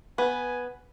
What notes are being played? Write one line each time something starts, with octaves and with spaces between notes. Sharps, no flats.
B3 B4 G#5